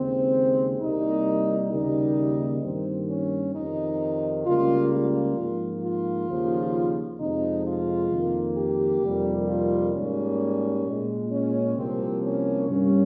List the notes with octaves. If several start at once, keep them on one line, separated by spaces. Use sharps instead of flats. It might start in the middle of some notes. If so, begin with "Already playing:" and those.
Already playing: D#2 C#3 G#3 C4
C2 C3 G3 A#3 D#4
D#2 C#3 G3 A#3 D#4
G2 D#3 A#3 C4
C#4
F2 C3 D#3 D#4
C#2 C#3 G3 A#3 F4
F4
G#2 F3 A#3
F4
D#2 C#3 F3
F2 C3 F3 G#3 D#4
F4
F2 D#3 A#3
G4
F2 C3 D#3 G3 A#3
F4
G#2 G3 A#3 C#4
A#2 G#3
C#4
C2 C3 F3 A#3 C4
C#4
G2 G3 A#3 C#4